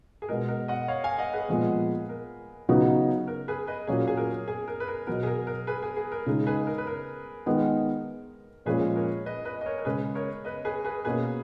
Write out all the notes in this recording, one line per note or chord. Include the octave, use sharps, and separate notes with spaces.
G#4
B2 G#3 B3 A#4
A#4
D#5 F#5
C#5 F5
F5 G#5
D#5 F#5
G#4 B4
A#2 F3 G#3 B3
A#4
C#3 F#3 B3 D#4
A#4
G#4 B4
B4 D#5
A#2 F#3 A#3 C#4 G#4
G#4
A#4
G#4
A#4
B4
A#4
B2 F#3 B3 A#4
G#4
A#4
A#4
G#4 B4
G#4
G#4
A#4
C#3 G#3 D#4
G#4 B4
A#4
B4
A#4
D#3 G#3 B3
A#2 F3 G#3 C#4 G#4 B4
A#4 C#5
B4 D#5
B4 D#5
D#5
A#4 C#5
A#4
C#3 G#3 C#4 G#4 B4
A#4 C#5
B4 D#5
G#4 B4
G#4 B4
B2 A#3 C#4 G#4 B4